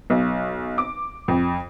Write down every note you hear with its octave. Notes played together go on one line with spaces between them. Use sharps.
B1
D6
F2